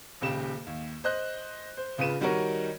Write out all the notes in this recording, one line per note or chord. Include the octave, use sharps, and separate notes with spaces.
D#1 C#2 C#3 G4 E7
D#2
C5 D#5 F#6
C5
C#2 C#3 F4 B4 D#7 E7
D#3 G3 D#4 F#4 A#4 C#5